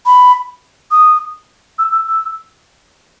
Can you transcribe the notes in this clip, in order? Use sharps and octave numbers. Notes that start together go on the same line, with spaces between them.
B5
D#6
E6
E6
E6